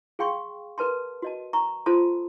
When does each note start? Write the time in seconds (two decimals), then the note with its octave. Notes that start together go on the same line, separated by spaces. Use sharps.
0.19 G#4 F5 G5 C6 C#6
0.78 A#4 B4 A5 C6
1.22 F#4 D#5 A5
1.53 A#5 C#6
1.86 F4 A4 C5 A5 C6 D#6